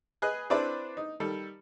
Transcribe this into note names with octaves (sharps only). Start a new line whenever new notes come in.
G#4 B4 D#5 F#6
C4 D4 E4 B4 D5 A5
D#4
D#3 G3 A4